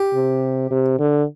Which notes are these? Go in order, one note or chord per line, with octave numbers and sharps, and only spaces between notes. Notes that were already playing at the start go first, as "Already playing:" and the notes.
Already playing: G4
C3
C3
D3